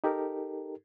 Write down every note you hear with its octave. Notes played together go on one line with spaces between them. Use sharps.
D#4 G4 A4 A#4